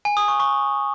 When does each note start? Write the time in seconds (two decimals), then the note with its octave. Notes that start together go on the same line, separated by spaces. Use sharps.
0.05 G#5
0.17 D#6
0.28 C#6
0.40 C#6